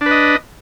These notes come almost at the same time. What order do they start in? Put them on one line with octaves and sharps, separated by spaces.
D4 B4 D#5